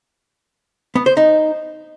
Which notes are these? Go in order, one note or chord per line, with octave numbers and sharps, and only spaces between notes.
B3
C5
D#4